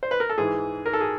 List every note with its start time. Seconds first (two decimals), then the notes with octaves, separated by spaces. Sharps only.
0.03 C5
0.11 B4
0.20 A#4
0.29 A4
0.38 G#2 E3 G#4
0.86 A#4
0.93 A4
1.00 G#4